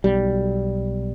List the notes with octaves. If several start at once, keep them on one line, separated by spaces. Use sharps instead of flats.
B1 G3